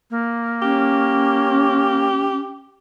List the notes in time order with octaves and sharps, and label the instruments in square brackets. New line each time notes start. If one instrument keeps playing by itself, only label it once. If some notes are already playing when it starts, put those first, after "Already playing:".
[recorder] A#3
[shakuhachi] C#4 [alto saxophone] G4